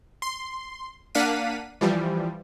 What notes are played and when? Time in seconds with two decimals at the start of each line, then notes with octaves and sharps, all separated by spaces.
0.22 C6
1.15 A#3 D4 F5 F#5 B6 D#7
1.81 E3 F3 G3